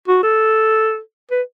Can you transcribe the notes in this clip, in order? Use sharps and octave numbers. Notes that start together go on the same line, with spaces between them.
F#4
A4
B4